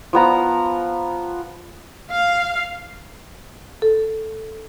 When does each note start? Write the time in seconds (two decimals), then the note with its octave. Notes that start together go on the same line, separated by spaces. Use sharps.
0.13 F3 B3 A#5
2.11 F5
3.82 A4